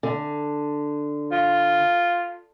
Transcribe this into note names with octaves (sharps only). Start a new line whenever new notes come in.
D3
F4